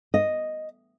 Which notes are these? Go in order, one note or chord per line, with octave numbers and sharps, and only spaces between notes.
D#5